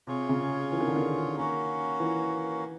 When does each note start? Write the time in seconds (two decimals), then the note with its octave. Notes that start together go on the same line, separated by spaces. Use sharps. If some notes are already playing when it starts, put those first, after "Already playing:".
0.07 C3 F4 G#4 C#5
0.29 C#3
0.72 E3
0.81 D#3
0.88 D3
0.96 D#3
1.36 A#3 C#4 F#4
2.00 E3